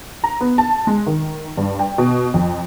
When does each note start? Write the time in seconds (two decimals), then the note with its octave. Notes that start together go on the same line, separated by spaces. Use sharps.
0.24 A#5
0.41 B3
0.58 A5
0.87 G#3
1.06 D#3
1.57 G2
1.79 G5
1.98 B2
2.34 F2